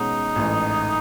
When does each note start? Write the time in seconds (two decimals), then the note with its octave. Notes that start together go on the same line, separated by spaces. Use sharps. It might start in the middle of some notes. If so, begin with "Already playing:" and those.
Already playing: B2 G#3 C#4 D#4
0.36 A1 G#2 E3 A3